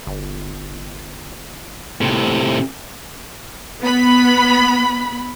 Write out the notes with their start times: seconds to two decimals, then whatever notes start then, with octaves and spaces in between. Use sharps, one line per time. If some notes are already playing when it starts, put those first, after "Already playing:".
0.07 G1
2.01 A2 C3
3.81 B3 B5